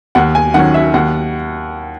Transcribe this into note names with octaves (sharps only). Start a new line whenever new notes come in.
D#2 F#5
G#5
D#3 F#3 C#4 F#5
E5
D#2 F#5